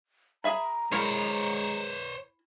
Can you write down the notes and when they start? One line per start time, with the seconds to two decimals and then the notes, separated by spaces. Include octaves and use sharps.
0.44 G#4 E5 A#5 B5
0.92 G#3 E4 A#4 C5 C#5